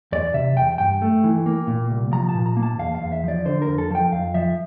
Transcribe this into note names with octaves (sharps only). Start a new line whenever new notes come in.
E2 D5
C3 E5
E2 G5
G2 G5
A3
E3
A#3
A#2
C2
F3 A#5
A5
A#2
A#5
A#3
A5
E2 F5
F5
E2
E5
F3 D5
D3 C5
A#4
F2
A4
F3 G5
F2 F5
F3 E5